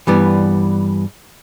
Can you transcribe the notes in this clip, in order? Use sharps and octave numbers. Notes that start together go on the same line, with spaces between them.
G2 E3 G3 B3